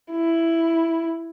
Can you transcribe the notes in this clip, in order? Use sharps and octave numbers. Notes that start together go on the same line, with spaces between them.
E4